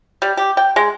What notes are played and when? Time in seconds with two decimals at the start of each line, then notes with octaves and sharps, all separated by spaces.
0.22 G3
0.37 G4
0.57 G5
0.76 G#3